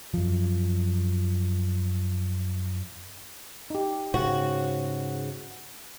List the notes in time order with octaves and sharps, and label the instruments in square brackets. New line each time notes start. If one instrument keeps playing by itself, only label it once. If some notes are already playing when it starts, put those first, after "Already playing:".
[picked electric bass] F#2 F3
[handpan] D#4 G4
[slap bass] G#2 C#3 [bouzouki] F#4